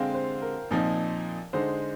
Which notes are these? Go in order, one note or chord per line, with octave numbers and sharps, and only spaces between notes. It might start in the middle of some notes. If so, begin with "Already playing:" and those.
Already playing: D3 G#3 C4 F5 G5
C5
A#4
A#2 F3 C4 D#4
D3 G#3 D#4 C5